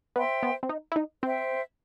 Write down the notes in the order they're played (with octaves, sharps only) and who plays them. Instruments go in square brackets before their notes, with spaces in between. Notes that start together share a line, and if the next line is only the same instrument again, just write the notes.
[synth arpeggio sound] B3 [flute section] C5 E5 G5 C6
[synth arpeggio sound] B3
C4
D#4
E4
D#4
[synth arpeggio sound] C4 [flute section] C5 E5 G5